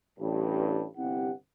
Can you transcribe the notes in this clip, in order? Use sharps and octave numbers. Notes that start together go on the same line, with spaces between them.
A1 G2
G1 C3 C4 E4 G4 F#5